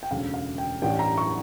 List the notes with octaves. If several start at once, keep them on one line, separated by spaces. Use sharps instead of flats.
G5
E1 D2 C#3 F5
F5
G5
A1 G2 E3 G3 G5
A#5
C#6